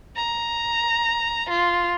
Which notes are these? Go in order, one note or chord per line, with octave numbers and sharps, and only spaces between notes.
A#5
F4